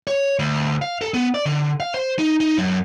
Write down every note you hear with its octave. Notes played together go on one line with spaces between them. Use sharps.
C#5
D2
F5
A4
B3
D5
D3
F5
C5
D#4
D#4
F#2